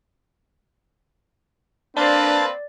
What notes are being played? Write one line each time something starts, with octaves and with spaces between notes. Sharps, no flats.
A#3 C4 D4 B4 D5 A5